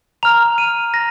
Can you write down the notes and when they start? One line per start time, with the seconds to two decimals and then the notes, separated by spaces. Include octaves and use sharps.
0.23 A#5 F6 F7
0.58 D#7
0.94 A#5 A#6